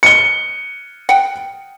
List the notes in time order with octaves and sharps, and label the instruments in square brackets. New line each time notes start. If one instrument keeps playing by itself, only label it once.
[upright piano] C#7 G7
[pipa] F#5 G5